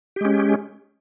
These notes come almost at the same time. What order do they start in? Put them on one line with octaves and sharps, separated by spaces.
G4 G#3 C#4